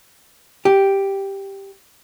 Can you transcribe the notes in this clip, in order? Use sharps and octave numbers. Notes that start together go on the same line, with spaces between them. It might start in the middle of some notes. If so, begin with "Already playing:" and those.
G4